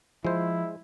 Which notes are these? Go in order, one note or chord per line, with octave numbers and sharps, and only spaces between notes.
F3 G#3 E4 C5